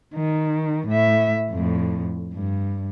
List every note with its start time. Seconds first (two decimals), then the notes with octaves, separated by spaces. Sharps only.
0.14 D#3
0.88 A2 E5
1.50 F2 A2
2.34 G2